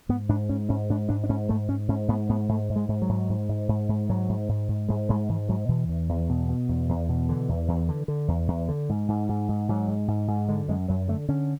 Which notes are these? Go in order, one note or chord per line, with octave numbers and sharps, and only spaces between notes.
G#2 B3
G#2 D4
G#2 C#4
G#2 C#4
G#2 D4
G#2 D4
D4
G#2 C#4
G#2 A3
G#2 C#4
G#2 C#4
G#2 B3
G#2 B3
G#2 A3
G#2
G#3
G#2
F#3
G#2
G#2
G#2
G#2
G#2
G#2 F#3
G#2
G#2
G#2
G#2 G#3
G#2 G#3
G#2 E3
G#2 F#3
B2 E3
E2
E2
B2
B2
E2
E2
B2
D3 E3
E2
E2
D3
D3
E2
E2
D3
G#2
G#2
G#2
G#2
G#2 F#3
G#2
G#2
G#2
D3 G#3
F#2 G#3
F#2 F#3
D3 A3
D3 C#4